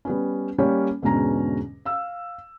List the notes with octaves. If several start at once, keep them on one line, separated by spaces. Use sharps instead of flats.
G3 B3 C#4
G3 A#3 C#4 C#5
E2 G#2 B2 D3 C#4 A#5
F5 E6